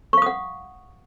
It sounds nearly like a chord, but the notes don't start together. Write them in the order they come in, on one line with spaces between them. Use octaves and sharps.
C#6 F5 D#6 F#5